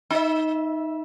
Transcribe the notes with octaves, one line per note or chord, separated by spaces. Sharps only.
D#4 E5